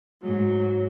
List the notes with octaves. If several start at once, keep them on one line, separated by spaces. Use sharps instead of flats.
G#2 F#3